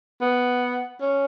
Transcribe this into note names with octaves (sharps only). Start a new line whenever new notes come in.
B3
C#4